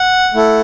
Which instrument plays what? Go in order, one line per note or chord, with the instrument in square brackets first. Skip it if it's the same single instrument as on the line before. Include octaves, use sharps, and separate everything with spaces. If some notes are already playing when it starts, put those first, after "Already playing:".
Already playing: [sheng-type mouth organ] F#5
A3 E4 A4